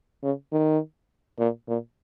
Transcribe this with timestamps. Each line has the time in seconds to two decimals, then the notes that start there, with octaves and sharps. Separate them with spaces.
0.23 C#3
0.52 D#3
1.39 A#2
1.68 A#2